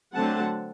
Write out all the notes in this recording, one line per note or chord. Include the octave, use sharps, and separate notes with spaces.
D3 F#3 A3 C4 F#5 A5